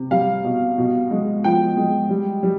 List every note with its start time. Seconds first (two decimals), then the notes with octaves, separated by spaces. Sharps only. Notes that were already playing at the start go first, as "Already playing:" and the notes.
Already playing: C3
0.11 G3 F5
0.44 B2
0.78 B2
1.11 G#3
1.44 F3 G5
1.77 G#3
2.09 G3
2.43 G3